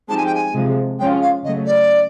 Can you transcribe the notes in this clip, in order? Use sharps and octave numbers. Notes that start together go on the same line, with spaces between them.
F3 G#3 C4 D#4 G4 A5
G#5
G5
G#5
C3 F3 G#3
F3 G#3 C#4 F4 G5
F5
C#3 F#3 A3 D#5
D5